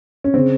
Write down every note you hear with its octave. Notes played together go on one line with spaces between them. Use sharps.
C#4
C#3 C4